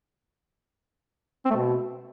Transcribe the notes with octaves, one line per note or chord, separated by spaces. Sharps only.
C4
A3
B2